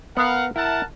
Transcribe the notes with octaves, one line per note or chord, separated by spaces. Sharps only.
B3 A#4 F5 F#5
E4 A#4 F#5 A5